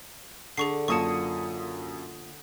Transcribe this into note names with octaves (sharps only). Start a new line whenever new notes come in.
D3 G#4 C#6 C7
F#2 A#3 F4 A5 C#6 D#6 C#7